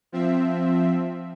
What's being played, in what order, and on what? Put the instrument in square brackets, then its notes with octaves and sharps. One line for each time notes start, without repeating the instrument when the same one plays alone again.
[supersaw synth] F3 C4 E5